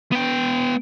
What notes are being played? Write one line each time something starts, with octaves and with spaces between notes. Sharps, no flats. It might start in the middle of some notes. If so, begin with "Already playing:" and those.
B3 G5